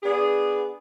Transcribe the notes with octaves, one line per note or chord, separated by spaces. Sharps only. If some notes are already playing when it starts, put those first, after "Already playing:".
B3 D4 G#4